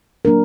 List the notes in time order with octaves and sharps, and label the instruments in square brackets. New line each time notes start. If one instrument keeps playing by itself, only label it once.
[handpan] F#3 A#3 D4 A#4